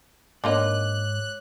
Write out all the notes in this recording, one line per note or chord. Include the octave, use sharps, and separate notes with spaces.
G#2 D3 A#3 D#4 C#5 D6 F#6